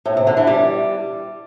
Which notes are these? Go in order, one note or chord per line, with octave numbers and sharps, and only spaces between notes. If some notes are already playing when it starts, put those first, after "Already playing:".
A2
C3
D3
E3
G3